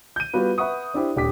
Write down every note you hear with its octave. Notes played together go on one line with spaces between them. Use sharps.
G6 D#7
G3 B3 F4 F#4 B4
B4 E5 F#5 C#6 D#6
D4 E4 G4 C5
D#1 D4 G4 D6 B6